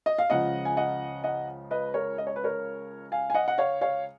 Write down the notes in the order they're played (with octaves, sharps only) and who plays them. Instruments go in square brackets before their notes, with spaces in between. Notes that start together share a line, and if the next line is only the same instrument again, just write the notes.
[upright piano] D#5
F5
C#2 C#3 F3 D#5 F#5
G#5
D#5 F#5
D#5 F#5
B4 D#5
A#4 C#5
D#5
C#5
B4
A#4 C#5
F5 G#5
G#5
D#5 F#5
F#5
C#5 F5
C#5 F5